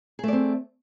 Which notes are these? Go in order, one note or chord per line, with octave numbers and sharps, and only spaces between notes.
A3 C4 G#4 D5